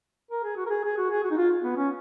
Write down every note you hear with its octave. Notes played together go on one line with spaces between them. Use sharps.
A#4
G#4
F#4
A#4
G#4
G#4
F#4
G#4
F#4
D#4
F4
B3
C#4